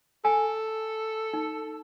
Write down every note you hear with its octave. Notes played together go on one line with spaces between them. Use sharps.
A4 G#5
D#4